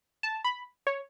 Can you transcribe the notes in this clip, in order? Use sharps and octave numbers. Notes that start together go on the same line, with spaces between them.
A5
B5
C#5